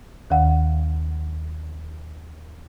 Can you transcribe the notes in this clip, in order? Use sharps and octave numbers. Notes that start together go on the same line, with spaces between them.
D#2 D#3 F5 F#5